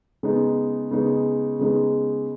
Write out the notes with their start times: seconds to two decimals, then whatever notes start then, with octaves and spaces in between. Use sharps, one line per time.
0.23 C#3 G#3 B3 D#4
0.91 C#3 G#3 B3 D#4
1.59 C#3 G#3 B3 D#4